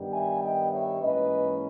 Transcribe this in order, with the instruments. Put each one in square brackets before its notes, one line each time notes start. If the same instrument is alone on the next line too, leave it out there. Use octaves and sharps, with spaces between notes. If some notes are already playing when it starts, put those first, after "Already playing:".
Already playing: [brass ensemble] G2 D#3 G3 B3
E5 G#5
D#5 G5
C#5 E5
G#2 E3 A#3 C#4 B4 D#5